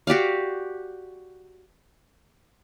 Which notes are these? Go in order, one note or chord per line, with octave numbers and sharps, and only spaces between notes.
F#4 G4 D5 F5